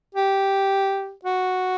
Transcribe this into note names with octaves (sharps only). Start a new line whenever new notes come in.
G4
F#4